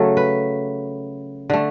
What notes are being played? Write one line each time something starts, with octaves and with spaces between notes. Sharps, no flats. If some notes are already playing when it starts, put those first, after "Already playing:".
Already playing: C#3 F#3 A3 A4
B4
D3 A3